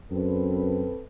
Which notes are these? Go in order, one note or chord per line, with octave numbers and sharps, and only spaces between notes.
F#2 C4 A4 B4